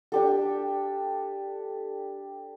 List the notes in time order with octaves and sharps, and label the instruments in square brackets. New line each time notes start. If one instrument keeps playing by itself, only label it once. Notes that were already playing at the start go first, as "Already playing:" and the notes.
[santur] D4 G4 A4